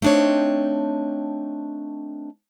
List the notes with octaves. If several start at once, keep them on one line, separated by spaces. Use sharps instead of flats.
A3 C4 D4 D#4 C#5